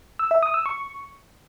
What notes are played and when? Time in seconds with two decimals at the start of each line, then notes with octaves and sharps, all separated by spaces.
0.19 E6
0.31 E5
0.43 D#6
0.54 E6
0.66 C#6